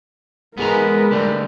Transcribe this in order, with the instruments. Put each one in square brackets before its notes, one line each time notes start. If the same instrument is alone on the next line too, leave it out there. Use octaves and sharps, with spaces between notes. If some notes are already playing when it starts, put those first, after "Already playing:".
[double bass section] G#3 [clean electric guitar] B3 G#4 A#5 [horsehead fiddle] A#4 B4
[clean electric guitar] D3 G3 A3